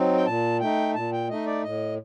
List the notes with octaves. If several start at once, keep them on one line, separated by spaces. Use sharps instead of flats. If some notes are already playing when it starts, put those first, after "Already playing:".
Already playing: F#3 C4 D#4
G5
A#2 A5
A3 D#4 G5
A#2 A5
G5
A3 D#4 D#5
D5
A2 D#5